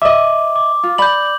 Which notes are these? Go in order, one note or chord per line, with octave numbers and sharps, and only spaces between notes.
D#5 E5 D6
D6
F4
D5 B5 G6 F#7